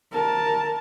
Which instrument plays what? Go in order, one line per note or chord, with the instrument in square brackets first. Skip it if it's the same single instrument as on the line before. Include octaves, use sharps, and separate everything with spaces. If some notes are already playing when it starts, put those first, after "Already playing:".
[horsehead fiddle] A#4 A5